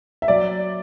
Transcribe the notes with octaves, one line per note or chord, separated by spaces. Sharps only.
E5
F#3 D5